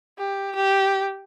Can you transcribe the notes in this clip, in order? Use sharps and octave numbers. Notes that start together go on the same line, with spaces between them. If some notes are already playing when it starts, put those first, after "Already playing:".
G4
G4